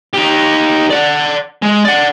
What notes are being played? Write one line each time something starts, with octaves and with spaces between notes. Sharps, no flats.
D#4 G4
D5 F#5
G#3
D5 F#5